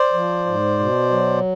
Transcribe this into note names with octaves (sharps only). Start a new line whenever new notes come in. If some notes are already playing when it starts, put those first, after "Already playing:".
Already playing: C5 D5
F3
G#2
B2
F#3